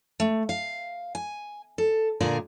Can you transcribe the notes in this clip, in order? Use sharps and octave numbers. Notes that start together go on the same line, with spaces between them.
A3
F5
G#5
A4
A#2 D3 G#4 A#4 D5